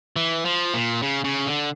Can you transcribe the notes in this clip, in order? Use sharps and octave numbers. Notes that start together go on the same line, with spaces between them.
E3
F3
A#2
C#3
C#3
D3